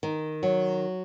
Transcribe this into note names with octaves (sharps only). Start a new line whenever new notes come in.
D#3
F#3